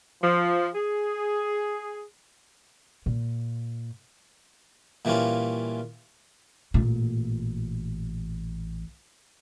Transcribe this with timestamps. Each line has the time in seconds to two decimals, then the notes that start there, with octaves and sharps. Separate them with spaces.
0.22 F3
0.74 G#4
3.06 A#2
5.05 A#2 E3 G3 C#4 F4
6.74 A1 A#2